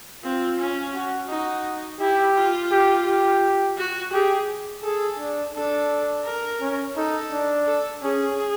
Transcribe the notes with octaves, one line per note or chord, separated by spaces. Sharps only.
C4 F4
C#4
F#4
D#4 F#4
E4 G4
F4
G4
G4
F#4
G4 G#4
G#4 A4
D4
D4 A4
A#4
C#4
D#4 A4
D4
A4
C#4 G#4